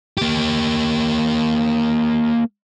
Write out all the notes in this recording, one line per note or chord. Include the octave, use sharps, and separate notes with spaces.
A#3 G4